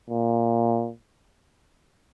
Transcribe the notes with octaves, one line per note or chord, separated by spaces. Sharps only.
A#2